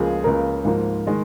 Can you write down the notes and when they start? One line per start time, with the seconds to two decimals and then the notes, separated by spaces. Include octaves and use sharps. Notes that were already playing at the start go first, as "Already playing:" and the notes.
Already playing: C#2 C#3 F3 A#3 G#4
0.24 C#2 C#3 A#3 A#4
0.65 G#2 F3 A#3
1.07 D#3 G#3